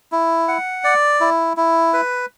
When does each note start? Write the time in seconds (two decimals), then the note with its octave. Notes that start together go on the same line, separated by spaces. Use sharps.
0.12 E4
0.48 F#5
0.84 D5
1.21 E4
1.57 E4
1.93 B4